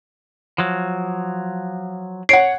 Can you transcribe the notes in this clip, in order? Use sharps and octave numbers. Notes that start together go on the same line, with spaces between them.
F3 F#3
C#5 F#5 C7 D7